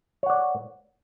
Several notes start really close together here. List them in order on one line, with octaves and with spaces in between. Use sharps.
C#5 F#5 D5